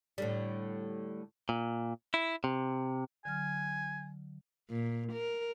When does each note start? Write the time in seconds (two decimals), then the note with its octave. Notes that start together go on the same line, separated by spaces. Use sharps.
0.18 A2 D3 G3
1.49 A#2
2.14 E4
2.44 C3
3.25 D3 F#3 G#5 F6
4.70 A#2
5.12 A#4